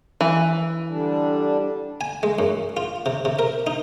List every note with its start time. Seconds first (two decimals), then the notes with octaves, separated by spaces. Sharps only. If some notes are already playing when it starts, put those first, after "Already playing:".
0.21 E3
0.89 D3 G3 D4
2.01 G#5
2.23 G#3
2.39 F#2
2.77 F4
3.06 C3
3.25 C3
3.39 A#4
3.67 D#4